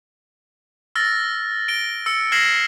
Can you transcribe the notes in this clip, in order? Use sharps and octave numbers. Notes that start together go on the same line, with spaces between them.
E6 F6 A6 A#6
D7 G7
E6 C#7
F6 G#6 A#6 C7 E7 F#7